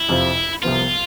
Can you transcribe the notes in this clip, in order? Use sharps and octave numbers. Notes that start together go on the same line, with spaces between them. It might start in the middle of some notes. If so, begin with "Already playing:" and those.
Already playing: E4
F2 C3 F3 C4 F4
C2 C3 F3 B3 F4